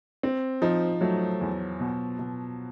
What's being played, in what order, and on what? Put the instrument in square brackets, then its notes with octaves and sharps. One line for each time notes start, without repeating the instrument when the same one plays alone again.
[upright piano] C4
[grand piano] F3 [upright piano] D#4
[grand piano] F#3 [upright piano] A3
[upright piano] E2
B2
B2